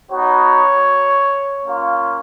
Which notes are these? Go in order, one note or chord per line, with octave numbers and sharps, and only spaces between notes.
B3 D#4 F#4 C#5
A#3 C#4 F4